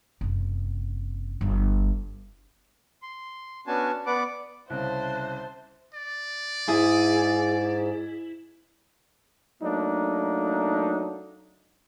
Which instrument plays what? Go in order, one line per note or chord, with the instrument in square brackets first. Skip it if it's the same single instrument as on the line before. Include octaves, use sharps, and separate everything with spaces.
[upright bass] F#1 C3
G1 G3
[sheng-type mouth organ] C6
B3 C#4 D4 F#4 G#5 A5
B3 B4 D5 F#5 D6
[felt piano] C2 C#3 [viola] C5 [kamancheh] E5 A5 [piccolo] F#6
[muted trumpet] D5
[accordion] G#2 [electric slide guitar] E4 [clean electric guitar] G#4
[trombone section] F#3 A3 A#3 D4 D#4